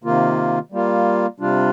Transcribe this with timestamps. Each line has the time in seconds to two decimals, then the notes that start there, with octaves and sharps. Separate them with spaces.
0.04 C3 D#3 A#3 F4
0.72 G3 A#3 F4
1.40 C3 G3 D4 F4